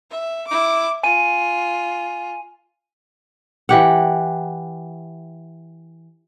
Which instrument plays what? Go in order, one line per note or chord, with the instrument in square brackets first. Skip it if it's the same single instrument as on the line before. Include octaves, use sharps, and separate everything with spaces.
[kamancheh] E5
E4 D6
[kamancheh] F4 [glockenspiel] G#5 D#7
[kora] E3 G4 F#5